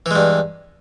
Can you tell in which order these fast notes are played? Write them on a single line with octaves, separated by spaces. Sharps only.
E3 G#3 G2